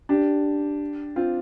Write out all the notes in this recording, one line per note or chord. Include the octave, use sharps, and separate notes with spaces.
D4 G4
C4 F4